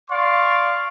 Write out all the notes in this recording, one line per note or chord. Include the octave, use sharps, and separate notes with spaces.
D5 F5 C6 C#6